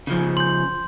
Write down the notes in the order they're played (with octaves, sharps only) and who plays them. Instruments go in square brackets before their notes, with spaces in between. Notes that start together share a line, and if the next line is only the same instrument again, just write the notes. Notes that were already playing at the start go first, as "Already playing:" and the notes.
[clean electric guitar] C#3 F3
[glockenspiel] C6 G6